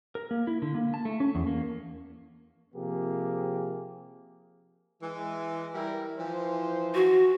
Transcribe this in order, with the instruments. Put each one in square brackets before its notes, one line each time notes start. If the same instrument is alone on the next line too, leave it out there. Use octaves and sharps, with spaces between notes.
[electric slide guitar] A#4
A#3
E4
D3
A#3
A5
A3
C#4
E2
A#3
[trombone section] C3 F3 A#3 G4 G#4
[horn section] E3 G#3
G3 E4 A#4
E3 F3 C5
[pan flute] F#4